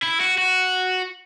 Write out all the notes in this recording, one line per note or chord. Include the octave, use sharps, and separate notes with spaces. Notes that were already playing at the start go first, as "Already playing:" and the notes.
E4
F#4
F#4